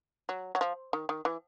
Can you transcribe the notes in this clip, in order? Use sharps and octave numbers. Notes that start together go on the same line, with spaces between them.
F#3
F#3
F3
D#3
D#3
E3